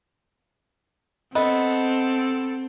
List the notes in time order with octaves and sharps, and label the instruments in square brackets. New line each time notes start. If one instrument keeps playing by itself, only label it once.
[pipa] B3 [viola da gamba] C4 [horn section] A4 [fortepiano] D#5